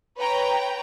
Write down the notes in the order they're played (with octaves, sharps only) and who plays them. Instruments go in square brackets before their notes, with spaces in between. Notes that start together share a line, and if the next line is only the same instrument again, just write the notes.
[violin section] B4 C#5 G5 A#5